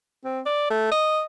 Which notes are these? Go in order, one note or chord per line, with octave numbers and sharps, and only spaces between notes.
C4
D5
A3
D#5